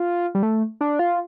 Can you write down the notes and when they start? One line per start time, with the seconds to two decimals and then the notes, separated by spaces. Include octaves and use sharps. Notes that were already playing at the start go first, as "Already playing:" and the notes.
Already playing: F4
0.35 G3
0.43 A3
0.81 D4
0.99 F4